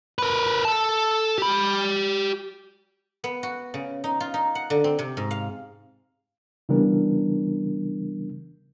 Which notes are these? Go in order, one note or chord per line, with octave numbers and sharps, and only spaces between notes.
A#4 B4
A4 A5
G4 B5
B3
F#4
C#3
D#4
F4
D#4
F#5
D3
C4
C3
G#2
F5
C#3 E3 G3 B3 D4 A#4